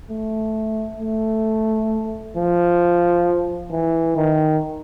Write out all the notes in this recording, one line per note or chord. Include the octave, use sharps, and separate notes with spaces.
A3
A3
F3
E3
D#3